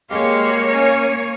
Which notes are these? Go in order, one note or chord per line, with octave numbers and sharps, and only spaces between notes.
G#3 A#3 G4 C#5 F5
C#4 G#5